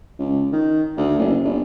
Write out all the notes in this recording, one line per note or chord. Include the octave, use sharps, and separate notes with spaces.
C#2
D#3
D2
F#1
G1